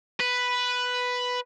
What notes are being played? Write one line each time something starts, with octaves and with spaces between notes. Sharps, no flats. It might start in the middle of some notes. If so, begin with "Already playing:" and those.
B4